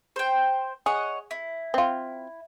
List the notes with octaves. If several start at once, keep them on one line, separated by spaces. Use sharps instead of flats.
C5 G5
G#4 C#5 D#5 F#5
E4
C4 F4